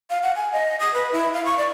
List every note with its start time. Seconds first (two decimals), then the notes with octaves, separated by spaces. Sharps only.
0.10 F5
0.23 F#5
0.36 G#5
0.53 D#5
0.80 D#6
0.94 B4
1.12 E4
1.33 F5
1.45 C#6
1.58 D5